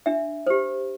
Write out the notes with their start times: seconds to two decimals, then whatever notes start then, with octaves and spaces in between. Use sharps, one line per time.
0.06 D4 E5
0.47 G4 C5